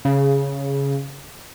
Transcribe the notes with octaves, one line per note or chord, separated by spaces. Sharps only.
C#3